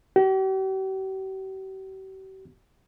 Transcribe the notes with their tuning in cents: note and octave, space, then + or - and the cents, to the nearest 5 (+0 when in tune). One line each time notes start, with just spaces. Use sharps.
G4 -45